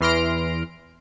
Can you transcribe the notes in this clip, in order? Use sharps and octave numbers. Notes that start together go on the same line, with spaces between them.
E2 E3 C6 F6 A#6 D7